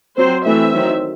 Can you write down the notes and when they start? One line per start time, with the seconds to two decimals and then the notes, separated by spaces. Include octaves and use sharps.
0.17 F#3 C4 C5
0.45 E3 A3 C4 E5
0.73 D#3 F#3 C4